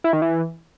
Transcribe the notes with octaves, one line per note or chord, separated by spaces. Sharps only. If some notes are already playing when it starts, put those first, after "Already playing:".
E4
D#3
E3